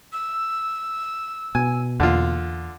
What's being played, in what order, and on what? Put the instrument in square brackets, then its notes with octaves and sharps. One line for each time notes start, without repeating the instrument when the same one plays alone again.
[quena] E6
[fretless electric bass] B2 [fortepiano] G#5
[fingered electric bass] E2 A#3 [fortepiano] D3 F4